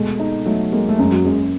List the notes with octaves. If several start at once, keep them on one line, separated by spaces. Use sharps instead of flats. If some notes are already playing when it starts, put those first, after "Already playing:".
Already playing: B2 G#3 A3
D#4
F#3 A3
G#3 A#3
A3
F#2 G#3
F#3
F#2 G#3